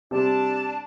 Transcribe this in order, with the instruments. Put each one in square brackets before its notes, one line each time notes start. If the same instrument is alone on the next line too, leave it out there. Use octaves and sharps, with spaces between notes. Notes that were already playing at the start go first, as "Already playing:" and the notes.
[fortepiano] C3 G3 [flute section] D4 A5